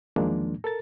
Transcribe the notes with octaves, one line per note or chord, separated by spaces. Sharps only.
E2 D#3 F3 G#3 A#3 D4
A4 A#4 A6